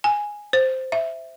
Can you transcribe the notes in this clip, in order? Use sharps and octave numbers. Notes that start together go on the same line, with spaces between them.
G#5
C5
E5